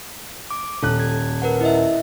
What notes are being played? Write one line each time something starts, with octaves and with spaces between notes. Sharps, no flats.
D6
D#1 A4 F#6
G#6
A#4 B4 F#5
E4 D#5 E5